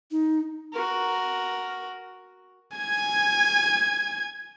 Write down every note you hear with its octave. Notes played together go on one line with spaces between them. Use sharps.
D#4
F#4 A#4
G#5 G#6